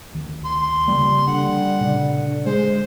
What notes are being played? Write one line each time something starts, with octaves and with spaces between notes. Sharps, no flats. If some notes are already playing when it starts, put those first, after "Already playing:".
D2 D#3
C6
C#3 F3 G3 A#3
D3 F#5
A#2 C#3 D4
G#3 C5